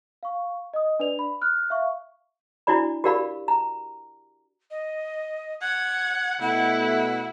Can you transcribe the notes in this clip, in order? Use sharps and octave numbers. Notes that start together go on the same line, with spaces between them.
F5 C#6
D#5 D#6
D4 B4 D5 F7
B5
F6 F#6
E5 F5 C#6
D4 E4 F#4 D5 B5
F#4 G4 A#4 D5 F5 B5
A#5
D#5
F#5 G#6
B2 A3 E4 F#5